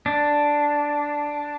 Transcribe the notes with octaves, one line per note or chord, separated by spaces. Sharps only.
D4